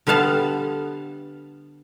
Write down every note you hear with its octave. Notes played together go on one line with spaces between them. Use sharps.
D3 G3 B3 F5 A5